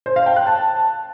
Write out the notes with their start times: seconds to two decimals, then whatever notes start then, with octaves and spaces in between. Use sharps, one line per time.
0.06 C5
0.16 F5
0.26 G5
0.36 F#6
0.47 A5